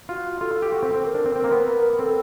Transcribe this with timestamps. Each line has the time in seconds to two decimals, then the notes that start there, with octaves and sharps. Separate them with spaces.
0.09 F4 F#4
0.41 F4 A4
0.62 G4
0.73 F#4
0.82 C4
0.94 C4
1.04 A#4
1.15 D4
1.26 C4
1.36 C4 A#4
1.44 A#3
1.51 B3
1.68 A#4
1.93 B3
1.99 C4 A4